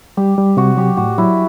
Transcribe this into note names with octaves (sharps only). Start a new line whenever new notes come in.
G3 G4
G3
C3 F#4
F#3 G4
A2 F#4
F#3 E4